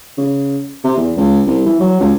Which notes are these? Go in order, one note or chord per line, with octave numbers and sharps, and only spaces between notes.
C#3
C3
E2
C#2
C2
E3
F#3
C#2